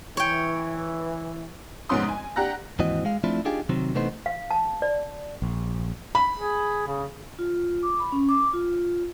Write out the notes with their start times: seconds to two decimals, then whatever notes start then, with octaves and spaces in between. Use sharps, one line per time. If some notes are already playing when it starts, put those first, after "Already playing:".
0.17 E3 C#5 G5
1.89 F1 G#2 B3 C#4 C6 D#6
2.09 G#5
2.36 D4 G4 F#5 A#5 F#6 A#6
2.79 D#2 G#2 E3 C4 F#4 D#5
3.05 G#3 F5
3.24 F3 A3 C4 D4 E4 F4
3.45 D4 D#4 F4 G4 G#4
3.69 C3 D#3 F#3 C4
3.95 C3 E3 A3 B3 D#4 C5
4.26 F5
4.51 A5
4.82 D5
5.42 A#1
6.15 B5
6.36 G#4
6.87 C#3
7.39 F4
7.83 D6
8.00 B5
8.12 C#4
8.29 D6
8.53 F4